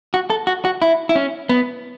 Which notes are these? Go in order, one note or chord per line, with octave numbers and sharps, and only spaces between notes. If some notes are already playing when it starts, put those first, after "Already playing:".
F#4
A4
F#4
F#4
E4
E4
C#4
B3